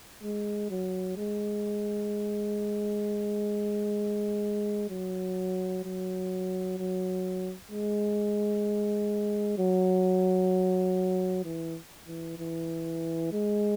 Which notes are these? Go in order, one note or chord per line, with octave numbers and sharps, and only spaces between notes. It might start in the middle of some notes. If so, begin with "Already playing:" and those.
G#3
F#3
G#3
F#3
F#3
F#3
G#3
F#3
E3
E3
E3
G#3